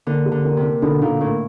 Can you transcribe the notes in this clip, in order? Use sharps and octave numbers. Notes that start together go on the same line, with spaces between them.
D3 A#3
G4
D3
A#3
C3
A#3
B2 D3
A#2 D3
A2 A#3